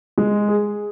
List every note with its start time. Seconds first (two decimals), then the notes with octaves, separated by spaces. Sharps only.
0.18 G#3
0.48 G#4